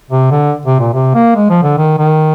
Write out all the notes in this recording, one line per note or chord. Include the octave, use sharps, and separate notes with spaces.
C3
D3
C3
A#2
C3
A#3
G#3
F3
D3
D#3
D#3